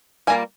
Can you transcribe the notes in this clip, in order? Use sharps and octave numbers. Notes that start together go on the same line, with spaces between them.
G3 A#3 F4 G#5